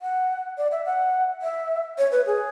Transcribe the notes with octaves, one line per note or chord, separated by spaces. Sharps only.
F#5
D5
E5
F#5
E5
C#5
B4
G#4